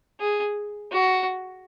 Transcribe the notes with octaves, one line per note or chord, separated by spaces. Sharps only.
G#4
F#4